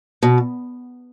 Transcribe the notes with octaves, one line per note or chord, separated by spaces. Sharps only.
B2